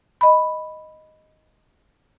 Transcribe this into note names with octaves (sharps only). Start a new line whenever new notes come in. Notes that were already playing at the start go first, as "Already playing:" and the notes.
D#5 B5